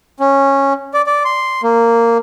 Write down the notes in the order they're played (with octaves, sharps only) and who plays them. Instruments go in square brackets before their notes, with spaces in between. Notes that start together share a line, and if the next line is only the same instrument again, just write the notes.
[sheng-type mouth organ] C#4
D5
D5
C6
A#3